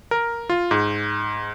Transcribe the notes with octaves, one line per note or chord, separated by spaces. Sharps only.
A#4
F4
G#2